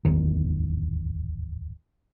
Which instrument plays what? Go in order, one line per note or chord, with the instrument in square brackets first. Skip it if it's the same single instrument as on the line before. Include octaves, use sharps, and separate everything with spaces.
[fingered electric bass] D1 G#1 E2 D#3